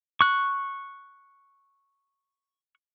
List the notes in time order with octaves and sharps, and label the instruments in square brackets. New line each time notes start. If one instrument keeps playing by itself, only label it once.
[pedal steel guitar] C#6 F#6